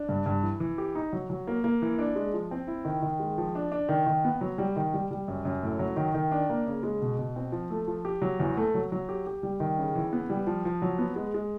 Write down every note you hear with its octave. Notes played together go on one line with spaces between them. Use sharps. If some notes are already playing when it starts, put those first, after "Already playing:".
Already playing: D4
G2
G2
E3
E3
G4
D#4
F#3
F#3
A#3
A#3
E3
D4
G#3
F3
C4
E4
D#3
D#3
G#3
F3
D4
D4
D#3
D#3
B3
F#3
G3
D#3
G3
G3
F#2
F#2
A2
F#3
D#3
D#3
D4
A#3
C#3
G#3
B2
B2
C4
F3
A3
F3
G4
F#3
E2
A3
F#3
F#3
G4
G4
G3
D#3
C#3
E3
B3
G3
F3
F3
F#3
B3
G#3
G#3